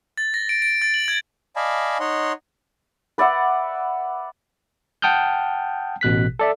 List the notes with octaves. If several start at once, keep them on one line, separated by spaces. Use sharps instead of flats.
A6
A#6
D7
D7
A6
F#7
G#6
D5 D#5 F5 G#5 A5 B5
D#4 C#5 D#5 F#5 C6
B4 D5 E5 F#5
F#5 G5 A5 D#6 F6 G6
A1 B2 F#6 B6
A4 D5 E5